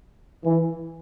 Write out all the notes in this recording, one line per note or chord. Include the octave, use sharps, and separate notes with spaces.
E3